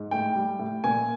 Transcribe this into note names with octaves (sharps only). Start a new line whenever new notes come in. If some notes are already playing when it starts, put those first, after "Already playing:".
Already playing: G#2
A2 G5
G3
A2
A#2 G#5